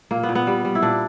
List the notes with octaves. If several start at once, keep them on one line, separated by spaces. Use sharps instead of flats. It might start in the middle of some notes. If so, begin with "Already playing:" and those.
A#2 A#3
B3
A#2
B3
G3
G3
E4
A#2 D4